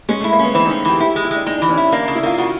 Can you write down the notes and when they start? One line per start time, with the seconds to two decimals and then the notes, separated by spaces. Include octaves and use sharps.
0.09 G#3 C#4
0.21 A3 E4
0.32 A#3
0.39 B3 C#4
0.54 E3 C4
0.66 C#4 D#4
0.85 E3 G4
1.00 E4 G4
1.16 G#3
1.24 E4
1.31 G#3 D4
1.46 G#3 D#4
1.58 E3 D4
1.69 C#4
1.77 E4
1.92 A#3 D4
2.04 C#3 D4
2.15 E4
2.23 A#3 F4
2.38 C#3 F#4